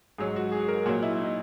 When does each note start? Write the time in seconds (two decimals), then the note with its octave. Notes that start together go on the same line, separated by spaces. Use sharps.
0.18 G#2 F#3 G#4
0.36 F#4
0.52 G#4
0.68 A#4
0.86 A#2 F#3 F#4
1.02 E4
1.19 D#4